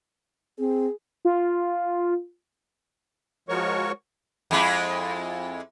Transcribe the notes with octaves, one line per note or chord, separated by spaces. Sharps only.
C4 G#4
F4
F3 G#3 F#4 A#4 C#5 C#6
F2 G#3 E4